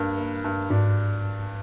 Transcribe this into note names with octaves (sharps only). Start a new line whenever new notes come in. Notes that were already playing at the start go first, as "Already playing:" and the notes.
Already playing: G2 A#3
A#3
G2
G#2 D4